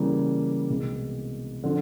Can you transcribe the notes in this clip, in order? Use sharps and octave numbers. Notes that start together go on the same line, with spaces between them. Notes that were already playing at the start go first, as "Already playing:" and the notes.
Already playing: C#3 E3 G3 A#3
C2 B2 G#3
D3 F3